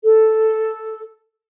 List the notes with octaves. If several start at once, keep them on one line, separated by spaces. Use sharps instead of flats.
A4